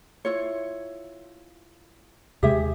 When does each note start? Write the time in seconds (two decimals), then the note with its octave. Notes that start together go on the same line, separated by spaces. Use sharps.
0.25 E4 F4 C#5
2.43 D#2 C3 G#3 G4 G#4 E5